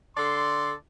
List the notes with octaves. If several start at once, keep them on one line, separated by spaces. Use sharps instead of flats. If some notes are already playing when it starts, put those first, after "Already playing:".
D3 A4 D5 C6